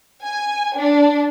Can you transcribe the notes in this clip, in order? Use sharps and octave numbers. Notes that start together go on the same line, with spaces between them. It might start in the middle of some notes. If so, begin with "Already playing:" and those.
G#5
D4